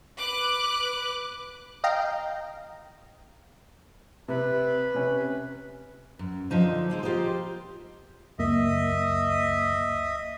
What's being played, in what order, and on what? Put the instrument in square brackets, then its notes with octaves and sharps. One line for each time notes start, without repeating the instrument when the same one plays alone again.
[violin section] B4 D6 F#6
[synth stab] D#5 F5 G5 A#5
[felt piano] C3 [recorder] B4
[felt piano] C3 C#4
[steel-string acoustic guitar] F#2
D3 F3 D#4 C5
G#3 C4 C5
F4 G4 A#4 C5 D#5
[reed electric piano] C#2 F#2 A#3 [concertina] D#5 E5